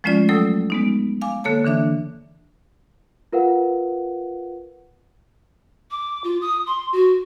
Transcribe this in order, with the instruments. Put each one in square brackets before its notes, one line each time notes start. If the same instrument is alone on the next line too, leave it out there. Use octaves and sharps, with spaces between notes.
[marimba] F3 G#3 A3 C#4 F4 D5
F#3 A3 A4 G5 D#6 E6
G#3 B3 D#4
F5 G#5 D6
D3 A#3 A4 C#5 A5
D3 E3 D4 E5
[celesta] F4 A#4 B4 F5 F#5
[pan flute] D6
F4
D#6
C6
F#4